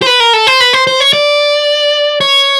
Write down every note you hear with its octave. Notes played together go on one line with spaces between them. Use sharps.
C5
B4
A#4
A4
C5
B4
C5
C5
C#5
D5
C#5